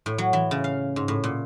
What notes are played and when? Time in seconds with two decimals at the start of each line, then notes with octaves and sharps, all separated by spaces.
0.06 A2
0.18 F#3
0.33 E3
0.51 C#3
0.64 F5
0.96 G#2
1.08 A2
1.24 A#2